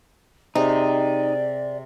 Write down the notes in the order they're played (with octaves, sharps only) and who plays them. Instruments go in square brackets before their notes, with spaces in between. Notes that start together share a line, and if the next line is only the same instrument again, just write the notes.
[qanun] C3 G#4 [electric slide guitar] D#4 [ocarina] D5